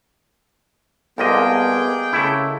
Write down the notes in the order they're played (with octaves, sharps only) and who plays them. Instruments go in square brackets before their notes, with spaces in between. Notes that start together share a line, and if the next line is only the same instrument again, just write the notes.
[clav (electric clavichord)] C2 D#5 [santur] G#3 A#3 A4 [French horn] B3 [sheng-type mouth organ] G#4 G5
[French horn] C#3 [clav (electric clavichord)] A3 E4